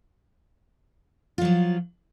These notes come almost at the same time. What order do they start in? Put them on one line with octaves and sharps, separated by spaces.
F4 F#3 F3